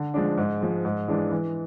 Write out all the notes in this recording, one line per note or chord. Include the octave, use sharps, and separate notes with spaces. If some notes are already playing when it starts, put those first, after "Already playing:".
Already playing: D3
F3 G#3 D4
G#2
F3 G#3
G#2
E3 G#3 D4
E3